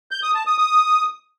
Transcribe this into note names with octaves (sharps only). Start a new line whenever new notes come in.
G6
D#6
A5
D#6
D#6